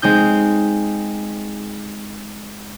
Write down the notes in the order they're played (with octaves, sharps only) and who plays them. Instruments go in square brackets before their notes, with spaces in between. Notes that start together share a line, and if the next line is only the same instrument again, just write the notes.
[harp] G#3 C4 D#4 G6